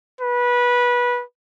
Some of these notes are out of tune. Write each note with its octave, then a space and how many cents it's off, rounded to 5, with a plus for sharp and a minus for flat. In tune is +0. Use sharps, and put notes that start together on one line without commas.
B4 -20